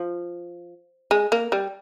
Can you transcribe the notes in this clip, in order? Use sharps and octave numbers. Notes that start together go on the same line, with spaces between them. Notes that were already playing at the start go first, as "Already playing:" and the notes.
Already playing: F3
G#3
A#3
G3